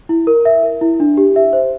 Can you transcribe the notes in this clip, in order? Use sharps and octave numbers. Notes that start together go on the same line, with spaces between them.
E4
A#4
E5
A#4
E4
D4
G4
E5
C5